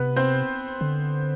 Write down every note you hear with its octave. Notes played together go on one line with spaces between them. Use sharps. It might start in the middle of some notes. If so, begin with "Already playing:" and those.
Already playing: C3 B3 B4
C4 C5
D3